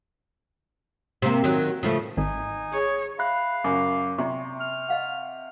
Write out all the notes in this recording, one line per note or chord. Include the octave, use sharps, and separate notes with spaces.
C3 A#3
D#3 F#3
C#3 F3 A3
G#1 D#4 G#5
G#4 C#5
E5 F5 B5 F#6
F#2 C#3 D6
C3 D5 A#5 C6 C#6
F6
D#5 F5 F#5